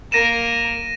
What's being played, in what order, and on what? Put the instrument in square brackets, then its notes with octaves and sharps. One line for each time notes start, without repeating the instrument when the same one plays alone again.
[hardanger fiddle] A#3 A#4 [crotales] A#6 D#7 E7